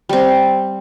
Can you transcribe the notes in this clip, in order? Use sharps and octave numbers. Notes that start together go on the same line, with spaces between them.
G3 C4